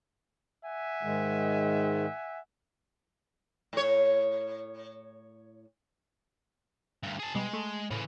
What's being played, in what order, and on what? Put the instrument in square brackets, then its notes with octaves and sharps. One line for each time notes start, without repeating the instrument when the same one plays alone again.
[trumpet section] E5 F#5 G#5
[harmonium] G#2 D#3 G#3
[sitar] A2 C#5
[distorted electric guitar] D2 G2
G#4 A5
[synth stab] B2 G3 [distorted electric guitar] G#3
[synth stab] A3
[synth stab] A2 [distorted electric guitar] C#3 E3